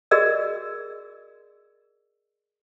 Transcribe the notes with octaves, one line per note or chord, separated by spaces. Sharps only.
F#4 G#4 A#4 D5 D#5 E6